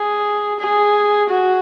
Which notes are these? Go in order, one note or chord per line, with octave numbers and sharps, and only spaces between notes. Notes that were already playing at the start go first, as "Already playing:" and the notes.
Already playing: G#4
G#4
F#4